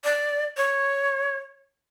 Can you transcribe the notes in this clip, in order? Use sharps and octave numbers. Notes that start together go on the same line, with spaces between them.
D5
C#5